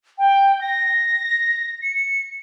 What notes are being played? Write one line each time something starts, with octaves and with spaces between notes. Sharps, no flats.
G5
A#6
C#7